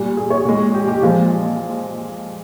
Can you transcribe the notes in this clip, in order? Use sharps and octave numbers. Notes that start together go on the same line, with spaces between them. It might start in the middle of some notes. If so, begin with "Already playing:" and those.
Already playing: A#2 G3
G#4
C#5
A#2 G#3
G4
G4
A#2 F3 G#3 F4